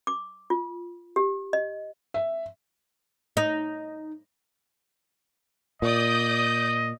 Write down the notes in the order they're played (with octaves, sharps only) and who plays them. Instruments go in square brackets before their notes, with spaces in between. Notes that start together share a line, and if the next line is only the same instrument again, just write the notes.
[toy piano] D6
F4
G4
D#5
[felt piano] E5
[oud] D#4
[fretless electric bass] A#2 [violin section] D5 D#6 G6 [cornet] D#5